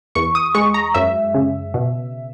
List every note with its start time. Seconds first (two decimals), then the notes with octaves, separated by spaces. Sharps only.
0.15 E2 C#6
0.35 D#6
0.55 G#3 C#6
0.74 A#5
0.94 F#2 E5
1.34 C#3
1.74 B2